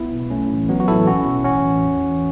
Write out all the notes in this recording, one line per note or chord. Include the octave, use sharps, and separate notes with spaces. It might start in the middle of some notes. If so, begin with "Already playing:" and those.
Already playing: B1 B3 E4
B2
B1 A3 C#4
A2 E3
A1 F#3 B3
F#4
A2 E3 E4 A4
B1 C#4 F#4
B2
A1 C#4 F#4
A2 E3
E2
E3